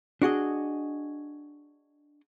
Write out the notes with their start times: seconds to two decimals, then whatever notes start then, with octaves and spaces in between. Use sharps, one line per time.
0.22 D4 F#4 G#4 D#5